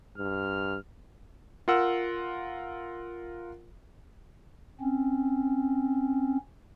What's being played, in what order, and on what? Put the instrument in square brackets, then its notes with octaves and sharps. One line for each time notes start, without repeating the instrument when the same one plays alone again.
[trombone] G2 [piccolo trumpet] F6
[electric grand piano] F4 A#4 F#5 E6
[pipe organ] C4 C#4